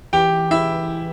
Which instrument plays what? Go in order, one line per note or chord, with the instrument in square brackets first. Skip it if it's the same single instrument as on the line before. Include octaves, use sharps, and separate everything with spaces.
[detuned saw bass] E3 [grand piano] G4 G5
[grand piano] E4 E5